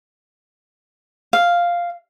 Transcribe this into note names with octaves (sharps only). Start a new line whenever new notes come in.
F5